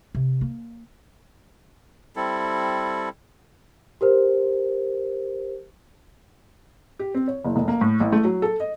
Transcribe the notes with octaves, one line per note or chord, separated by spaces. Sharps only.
C3
A#3
G3 C4 E4 A4
G4 A#4 C5
G4
C4
C#5
F#1
F1
A#3
A2
A1
A3
F#3
A4
D#5